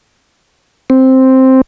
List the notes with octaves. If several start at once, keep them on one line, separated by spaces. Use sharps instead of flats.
C4